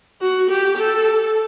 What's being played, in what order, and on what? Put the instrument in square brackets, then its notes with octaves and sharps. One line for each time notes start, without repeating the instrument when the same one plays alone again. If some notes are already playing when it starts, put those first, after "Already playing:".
[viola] F#4
G4
A4